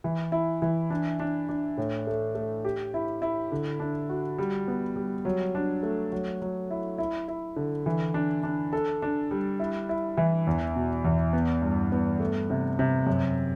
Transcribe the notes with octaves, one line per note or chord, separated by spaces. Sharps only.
E3
E4
E3
D4
D4
D4
A2
A3
A3
G4
E4
E4
D3
D4
F#4
G3
B3
G3
F#3
D4
A3
F#3
F#3
E4
E4
E4
D3
E3
D4
D4
A4
D4
G3
E4
E4
E3
E2
B2
E2
B3
G2
B3
A3
C3
C3
F#2